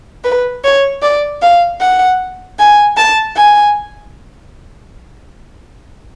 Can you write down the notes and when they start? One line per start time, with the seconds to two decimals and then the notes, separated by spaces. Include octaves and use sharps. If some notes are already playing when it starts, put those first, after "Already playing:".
0.24 B4
0.64 C#5
1.02 D5
1.42 F5
1.80 F#5
2.59 G#5
2.97 A5
3.36 G#5